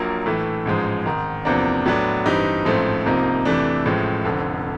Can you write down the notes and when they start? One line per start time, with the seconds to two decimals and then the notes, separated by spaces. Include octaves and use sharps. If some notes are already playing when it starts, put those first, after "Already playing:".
Already playing: A#1 A#2 F#3 A#3
0.26 A2 E3 A3
0.65 A1 G#2 F3 G#3
1.06 G#1 G#2 D#3
1.45 E2 C3 F3 A#3 D4
1.86 A2 F#3 B3 D4
2.25 G2 E3 G3 C4 D#4
2.65 A1 G#2 F3 A3 C4
3.06 C2 C3 F3 A#3 D#4
3.45 F2 C3 E3 A3 D4
3.85 A1 A2 F3 G#3
4.24 F1 F2 D3 F3